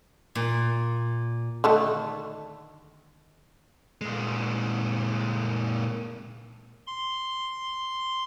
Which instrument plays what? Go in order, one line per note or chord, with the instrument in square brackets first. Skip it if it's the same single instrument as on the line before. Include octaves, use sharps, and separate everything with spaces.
[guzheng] A#2
[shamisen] D3 D#3 A3
[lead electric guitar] A#2 G#3
[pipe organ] C6